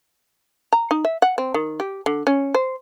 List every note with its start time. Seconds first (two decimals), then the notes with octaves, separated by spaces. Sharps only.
0.73 A#5
0.91 D#4
1.05 E5
1.22 F#5
1.38 C4
1.54 D#3
1.80 G4
2.06 D3
2.27 C#4
2.54 C5